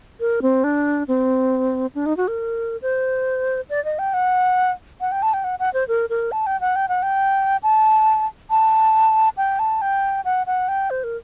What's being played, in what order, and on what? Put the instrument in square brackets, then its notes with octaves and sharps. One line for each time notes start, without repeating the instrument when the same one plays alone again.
[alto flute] A#4
C4
D4
C4
D4
D#4
F#4
A#4
C5
D5
D#5
G5
F#5
F#5
G5
A5
G5
F#5
F#5
C5
A#4
A#4
A5
G5
F#5
G5
F#5
G5
A5
A5
G5
A5
G5
F#5
F#5
G5
C5
A#4